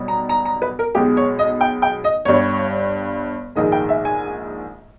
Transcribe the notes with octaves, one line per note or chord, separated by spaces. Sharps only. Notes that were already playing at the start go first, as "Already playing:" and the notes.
Already playing: B1 B2 G3
A#5
A#5
A#5
B4
A#4
B1 B2 G#3 G4
C#5
D#5
G5
G5
D#5
G1 G2 G3 C#5
A#1 G#2 D#3 G#3 D#5
G5
E5
G#5